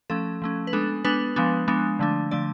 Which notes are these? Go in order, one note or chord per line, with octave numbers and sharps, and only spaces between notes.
F3 A3 C#4 A4
F3 A3 C#4
B4
G#3 B3 D4 A4
G#3 B3 D4 B4
F3 G#3 B3 D4
F3 G#3 B3 D4
D3 F3 A3 D4
D3 F3 A3 D4 D5